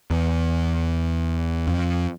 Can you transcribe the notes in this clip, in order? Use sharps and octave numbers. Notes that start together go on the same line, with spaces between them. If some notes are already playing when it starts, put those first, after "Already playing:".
E2
F2